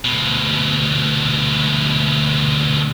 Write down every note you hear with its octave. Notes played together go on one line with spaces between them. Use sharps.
D2 B2